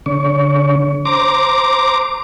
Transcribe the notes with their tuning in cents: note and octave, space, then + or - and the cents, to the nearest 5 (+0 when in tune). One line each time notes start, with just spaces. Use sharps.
D3 -35 C#5 +35
C5 +0 A#5 +0 D6 +0